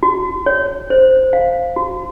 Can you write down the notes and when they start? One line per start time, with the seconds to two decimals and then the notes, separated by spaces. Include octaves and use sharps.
0.03 F#4
0.46 C#5
0.90 C5
1.33 F5
1.76 F#4